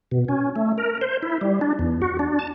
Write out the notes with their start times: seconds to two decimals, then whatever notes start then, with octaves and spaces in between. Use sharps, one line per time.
0.11 B2
0.28 C#4
0.56 A3
0.78 A#4
1.01 C5
1.22 E4
1.41 G3
1.61 D4
1.79 E2
2.02 F#4
2.19 D4
2.39 A5